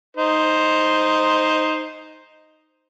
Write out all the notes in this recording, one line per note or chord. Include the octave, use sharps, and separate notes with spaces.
D#4 C5